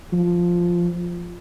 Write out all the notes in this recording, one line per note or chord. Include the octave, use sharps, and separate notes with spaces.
F3